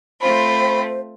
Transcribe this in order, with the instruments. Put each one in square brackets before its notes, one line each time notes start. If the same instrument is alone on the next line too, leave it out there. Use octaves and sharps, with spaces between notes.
[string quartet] A3 C4 F4 [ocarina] C5 [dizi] B5